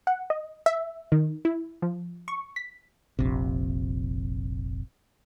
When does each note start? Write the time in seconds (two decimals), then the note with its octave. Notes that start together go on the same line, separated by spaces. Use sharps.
0.07 F#5
0.30 D#5
0.66 E5
1.12 D#3
1.45 E4
1.82 F3
2.28 C#6
2.56 B6
3.19 F1 A#1 C3